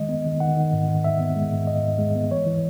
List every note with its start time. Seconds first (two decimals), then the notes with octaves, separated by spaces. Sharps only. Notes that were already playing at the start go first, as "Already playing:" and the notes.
Already playing: D#3 G#3 D#5
0.09 B3
0.26 D#3
0.40 D#3 F#5
0.57 D#3
0.73 G#2
0.88 D#3
1.04 D#3 E5
1.21 B3
1.36 G#3
1.52 G#2
1.67 D#3 D#5
1.83 G#2
1.99 G#3
2.16 B3
2.31 E3 C#5
2.46 E3